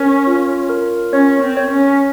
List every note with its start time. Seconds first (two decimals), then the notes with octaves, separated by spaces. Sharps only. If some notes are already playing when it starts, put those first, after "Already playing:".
Already playing: C#4 A#4 C#5
0.27 F4
0.69 A#4
1.13 C#4 C#5
1.42 C4
1.57 C#5
1.71 C#4